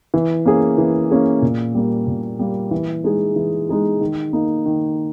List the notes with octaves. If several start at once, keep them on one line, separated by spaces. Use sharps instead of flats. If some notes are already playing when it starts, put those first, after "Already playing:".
E3
A#3 C#4 G#4
E3
A#3 C#4 G#4
A#2
G3 A#3
A#2
G3 A#3
E3
G#3 D#4 G#4
E3
G#3 D#4 G#4
D#3
A#3 D#4
D#3